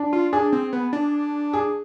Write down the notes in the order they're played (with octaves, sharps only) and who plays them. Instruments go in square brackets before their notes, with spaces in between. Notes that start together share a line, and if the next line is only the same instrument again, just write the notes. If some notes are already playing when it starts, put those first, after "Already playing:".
Already playing: [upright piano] D4
[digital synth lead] F4
[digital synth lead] D4 [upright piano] G#4
[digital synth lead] C4
B3
D4
[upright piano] G#4